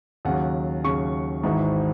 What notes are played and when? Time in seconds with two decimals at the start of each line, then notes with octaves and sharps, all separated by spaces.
0.25 D#2 C#3 F#3 F#5
0.84 D#2 C#3 F#3 C#6
1.44 G#1 G#2 E3